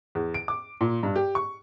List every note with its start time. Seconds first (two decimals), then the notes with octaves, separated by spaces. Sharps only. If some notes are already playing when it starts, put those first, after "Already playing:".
0.15 E2
0.34 D7
0.48 D6
0.81 A#2
1.03 G2
1.16 G4
1.35 C#6